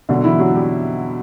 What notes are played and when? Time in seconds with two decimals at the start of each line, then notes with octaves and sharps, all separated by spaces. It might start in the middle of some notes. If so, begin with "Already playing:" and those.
0.09 B2 D3 F#3 D4
0.24 E3 E4
0.39 F#3 F#4
0.54 G3 G4